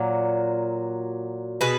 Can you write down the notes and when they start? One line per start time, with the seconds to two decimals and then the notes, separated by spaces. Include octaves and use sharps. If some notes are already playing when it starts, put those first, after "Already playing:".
Already playing: A#2 F#3
1.61 B2 G#4 B4